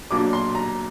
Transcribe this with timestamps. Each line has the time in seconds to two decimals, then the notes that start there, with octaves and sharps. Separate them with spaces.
0.11 B1 A#2 F#3 A#3 D4 D6
0.33 C6
0.55 A#5